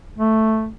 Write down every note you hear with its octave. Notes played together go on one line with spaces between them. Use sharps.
A3